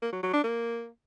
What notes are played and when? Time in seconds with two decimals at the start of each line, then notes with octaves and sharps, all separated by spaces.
0.02 A#3
0.13 F#3
0.23 F#3
0.33 D4
0.44 A#3